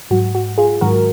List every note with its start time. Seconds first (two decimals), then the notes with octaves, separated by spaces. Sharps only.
0.11 G#2 F#3 F#4
0.35 F#4
0.58 F4 G#4
0.81 G#2 D#3 F#3 F#4 A#4